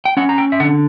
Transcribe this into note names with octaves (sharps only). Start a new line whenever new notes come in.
G5
C#4 F#5
A#5
G5
E5
D3 F#5